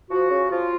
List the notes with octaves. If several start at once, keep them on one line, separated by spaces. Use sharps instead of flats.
F3 F#4
C#3
F3 F4